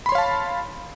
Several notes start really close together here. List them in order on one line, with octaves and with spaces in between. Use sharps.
B5 C6 C#5 F5 A5